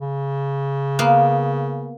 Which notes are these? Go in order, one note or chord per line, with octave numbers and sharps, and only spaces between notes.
C#3
A#3 B3